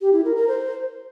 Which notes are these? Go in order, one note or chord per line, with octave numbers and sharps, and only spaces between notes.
G4
E4
A#4
A#4
C5